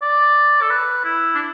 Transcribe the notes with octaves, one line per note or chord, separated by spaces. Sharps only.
D5
A4
B4
E4
D4
E4